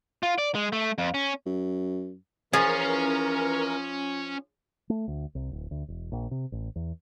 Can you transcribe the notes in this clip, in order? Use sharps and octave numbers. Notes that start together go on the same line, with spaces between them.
F4
D5
G#3
A3
F2
C#4
F#2
E3 F3 C#4 G#4 A#4 C#5
A3
D2
C2
D1
D2
E1
A#1
C3
A1
E2